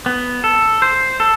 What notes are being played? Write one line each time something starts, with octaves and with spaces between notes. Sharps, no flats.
B3
A4
C5
A4